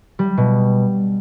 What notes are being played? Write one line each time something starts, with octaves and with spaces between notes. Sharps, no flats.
G3
B2